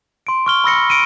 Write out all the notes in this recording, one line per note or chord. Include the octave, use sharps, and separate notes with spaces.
C6 D7
C#6 F6 G7
B5 E6 A#6 C#7
D7 D#7